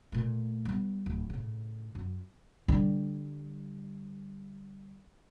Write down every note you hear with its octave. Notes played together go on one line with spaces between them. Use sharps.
A#2 A3
G3 B3
D1
A2 C#3
F#2
D3 G3